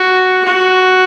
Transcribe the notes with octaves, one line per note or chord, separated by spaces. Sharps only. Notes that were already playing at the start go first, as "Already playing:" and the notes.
Already playing: F#4
F#4